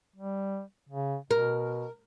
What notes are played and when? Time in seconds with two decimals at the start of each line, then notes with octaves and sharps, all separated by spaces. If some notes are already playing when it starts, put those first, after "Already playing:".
0.16 G3
0.89 C#3
1.31 B2 A#4